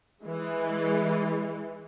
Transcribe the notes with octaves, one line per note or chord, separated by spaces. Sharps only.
E3 G#3